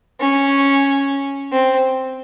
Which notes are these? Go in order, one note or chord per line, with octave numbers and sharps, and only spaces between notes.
C#4
C4